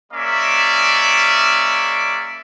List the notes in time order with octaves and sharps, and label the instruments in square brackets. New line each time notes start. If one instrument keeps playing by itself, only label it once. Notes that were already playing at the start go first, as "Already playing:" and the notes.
[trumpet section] G#3 A#3 C#4 D5 E5